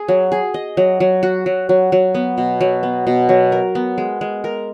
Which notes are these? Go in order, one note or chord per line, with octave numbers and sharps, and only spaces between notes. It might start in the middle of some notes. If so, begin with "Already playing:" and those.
Already playing: G#4
F#3
G#4
D#5
F#3
F#3
F#4
F#3
F#3
F#3
B3
B2
F#3
B3
B2
F#3
A#4
B3
G#3
G#3
A#4